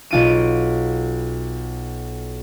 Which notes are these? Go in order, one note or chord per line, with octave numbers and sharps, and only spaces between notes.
B1 F4 D7 D#7